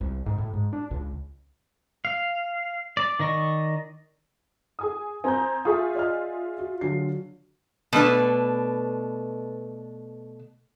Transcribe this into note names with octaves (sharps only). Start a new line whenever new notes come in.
C2
G#2
A2
G#2
D4
C#2
F5
D5
D#3 D5 D#5 C#6
G#4 G#5 D#6
C4 G#5 A#5 G6
F4 G#4 E5 C#6 D#6
D5 D#5 F6
F#4
D3 F#3 C7
B2 A3 D4 B4